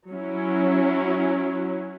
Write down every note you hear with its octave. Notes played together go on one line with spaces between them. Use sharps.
F#3 C#4 E4